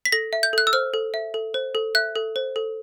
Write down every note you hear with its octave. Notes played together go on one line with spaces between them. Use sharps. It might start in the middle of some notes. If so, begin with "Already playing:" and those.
B6
A4 A#6
E5
G6
A4 F#6
E6
C5 F6
A4
E5
A4
C5
A4
E5 F#6
A4
C5
A4